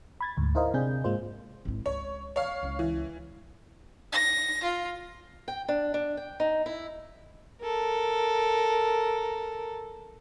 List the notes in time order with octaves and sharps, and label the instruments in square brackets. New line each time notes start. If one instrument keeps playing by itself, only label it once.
[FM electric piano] B5 G#6 A6
D2 G#2
D#4 E4 A#4 C5 D#5 F5
C3 C4 D4 G#4 G6
G#2 G#3 A#3 F4 C5
[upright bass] G#1 E4
[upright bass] C#2 [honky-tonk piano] C#5
[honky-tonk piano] C#5 F5
[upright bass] C#2 E4
[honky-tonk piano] E3
[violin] A#6
F4
[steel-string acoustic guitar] G5
D4
D4
G5
D#4
E4
[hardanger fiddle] A4 A#4